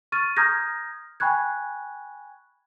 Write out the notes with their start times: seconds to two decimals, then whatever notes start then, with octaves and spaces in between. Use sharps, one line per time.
0.12 C#6 F6 A6 D#7
0.37 A#5 D#6 F6 G6 G#6 A#6
1.20 G5 G#5 B5 C#6 F#6 G#6